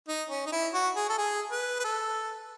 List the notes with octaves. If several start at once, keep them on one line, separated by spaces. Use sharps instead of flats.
D#4
C#4
D#4
E4
F#4
G#4
A4
G#4
B4
B4
A4